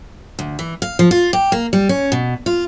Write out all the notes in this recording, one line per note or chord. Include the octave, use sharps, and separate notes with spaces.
D2
E3
F5
F3
F4
G4
A#3
G3
C#4
B2
F4